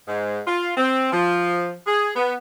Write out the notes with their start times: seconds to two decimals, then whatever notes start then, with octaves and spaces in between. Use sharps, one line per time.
0.08 G#2
0.47 F4
0.77 C4
1.12 F3
1.87 G#4
2.16 B3